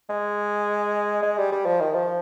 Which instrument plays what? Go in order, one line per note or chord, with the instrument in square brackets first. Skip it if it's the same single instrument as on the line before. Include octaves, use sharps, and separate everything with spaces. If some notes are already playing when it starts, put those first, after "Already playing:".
[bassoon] G#3
G#3
G3
G3
F3
D#3
F3